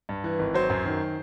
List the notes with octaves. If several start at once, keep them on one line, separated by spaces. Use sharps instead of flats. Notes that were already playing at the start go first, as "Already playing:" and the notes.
G2
E3
G#1
F#3 C5
F#2
D#3